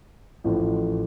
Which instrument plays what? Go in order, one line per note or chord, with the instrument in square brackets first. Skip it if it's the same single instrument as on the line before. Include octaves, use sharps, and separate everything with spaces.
[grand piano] A1 A2 F3